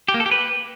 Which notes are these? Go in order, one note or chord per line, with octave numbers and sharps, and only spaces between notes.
G4
A#3
A4
G4
B4